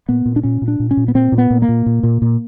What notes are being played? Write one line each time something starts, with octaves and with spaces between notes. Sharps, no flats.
A#2 B3
A#2
D4
A#2 C#4
A#2
D4
A#2
C#4
A#2
B3
A#2 C4
A#2
B3
A#2
A#3
A#2
A#2
A#2
A#2